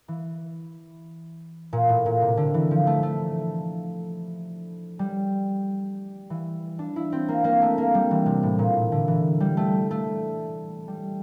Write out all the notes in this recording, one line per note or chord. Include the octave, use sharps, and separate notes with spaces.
E3
A#2
A2
A#2
C3
D3
E3
F3
A3
A3
G3
E3
D4
E4
C4
A#3
A#3
A3
A#3
G3
E3
C3
A2
A#2
D3
E3
G3
A3
A3
G3